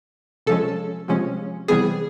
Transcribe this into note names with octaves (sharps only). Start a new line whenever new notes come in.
C3 F3 G#3 C#4 A4
C3 F3 G#3 C#4
C3 E3 G3 B3 G#4